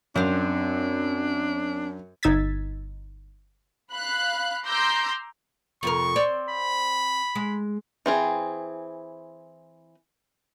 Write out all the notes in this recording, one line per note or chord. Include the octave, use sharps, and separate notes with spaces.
F#2 C4 D4 F5
G1 D#4 E6 G#6 A6 B6
F5 B5 F#6
A#5 C6 D6 E6 G6 A#6
F2 C3 A#4 C#6
C4 C#5 D5
B5
G#3
E3 C4 G#4